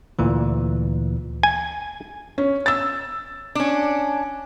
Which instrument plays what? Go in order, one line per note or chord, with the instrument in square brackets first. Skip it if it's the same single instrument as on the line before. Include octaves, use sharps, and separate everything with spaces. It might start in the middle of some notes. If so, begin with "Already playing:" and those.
[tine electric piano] D2 A#2 E3
[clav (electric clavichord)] G#5
[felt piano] C#4
E6 A6
[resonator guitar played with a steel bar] C#4 D4